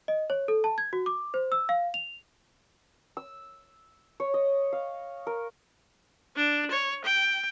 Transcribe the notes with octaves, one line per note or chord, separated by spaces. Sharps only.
D#5
C#5
A4
A5
G#6
F#4
D6
C5
E6
F5
F7
E6
C#5
D#5
F5
A#4
D4
C#5
G5